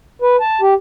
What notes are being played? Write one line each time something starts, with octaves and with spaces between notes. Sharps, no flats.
B4
A5
G4